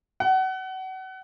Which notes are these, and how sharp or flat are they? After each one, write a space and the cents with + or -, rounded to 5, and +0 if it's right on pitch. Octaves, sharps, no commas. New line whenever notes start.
F#5 +30